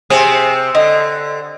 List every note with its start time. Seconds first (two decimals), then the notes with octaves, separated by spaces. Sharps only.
0.10 C3 C4 G#4
0.75 D3 D#5